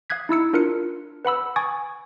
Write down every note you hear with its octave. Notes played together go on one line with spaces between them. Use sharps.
F5 D#6 F#6 G#6 B6
D#4 E4 E6 C#7
D4 F4 A#4 F#6 C#7
B4 F#5 B5 E6
G#5 C#6 D#6 G#6 A6 D7